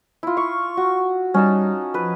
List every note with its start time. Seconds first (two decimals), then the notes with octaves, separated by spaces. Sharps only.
0.23 E4 F4
0.37 F5 C#6
0.77 F#4
1.34 G3 C#4 D#4 A5
1.94 F3 B4